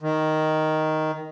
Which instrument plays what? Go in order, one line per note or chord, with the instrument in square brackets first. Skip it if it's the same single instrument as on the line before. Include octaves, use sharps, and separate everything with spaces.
[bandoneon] D#3